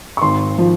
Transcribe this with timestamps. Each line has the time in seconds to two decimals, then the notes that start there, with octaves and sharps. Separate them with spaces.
0.17 C#6
0.22 G#1 C6
0.59 F3